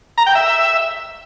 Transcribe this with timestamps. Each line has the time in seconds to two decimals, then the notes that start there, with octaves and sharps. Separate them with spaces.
0.18 A#5
0.26 G5
0.35 E5